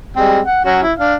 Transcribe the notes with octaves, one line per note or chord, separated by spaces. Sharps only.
G3 G#3 C4
F#5
F#3 C#4 F#4
E4
D4 F5